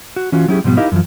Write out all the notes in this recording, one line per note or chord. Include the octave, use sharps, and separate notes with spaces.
F#4
E3 C#4 F4 F#4
F#3 C#4 E4 G4 G#4
G#2 B2 F3 G3 B3
D#4 E4 G4 A#4 D#5 F5
F#2 E3 F3